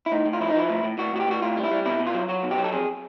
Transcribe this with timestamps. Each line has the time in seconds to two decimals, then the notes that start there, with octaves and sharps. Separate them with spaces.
0.06 E4
0.12 A2 D#4
0.26 A2
0.33 F4
0.41 F3 E4
0.50 D#4
0.55 F3 E4
0.70 A2
0.84 A2
0.98 A2 F#4
1.13 A2 F#4
1.20 G4
1.27 A2 F#4
1.42 A2 F4
1.57 G3
1.64 E4
1.71 G3
1.85 B2 E4
2.00 B2
2.07 F4
2.14 F#3
2.29 F#3 F#4
2.43 B2
2.51 G4
2.58 F#3
2.64 A4
2.72 F2 G#4